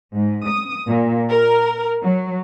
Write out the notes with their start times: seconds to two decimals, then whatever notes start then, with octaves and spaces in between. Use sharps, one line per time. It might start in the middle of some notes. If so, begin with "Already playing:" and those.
0.14 G#2
0.49 D#6
0.88 A#2
1.29 A#4
2.04 F#3